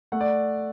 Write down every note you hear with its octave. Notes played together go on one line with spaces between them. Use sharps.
A3 F#5
D5